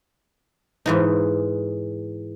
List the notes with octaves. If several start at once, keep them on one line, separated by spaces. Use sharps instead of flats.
G#2 E3 D#4